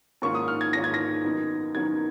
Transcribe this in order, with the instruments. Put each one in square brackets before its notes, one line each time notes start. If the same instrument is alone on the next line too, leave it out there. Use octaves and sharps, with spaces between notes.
[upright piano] G#2 D#3 A#3 C#4 F4 C#6
D#6
F6
G#6
G#2 D#3 A#3 C#4 F4 A#6
G#6
A#6
F#2 D#3 F#3 B3 D#4
F#2 D#3 F#3 B3 D#4 G#6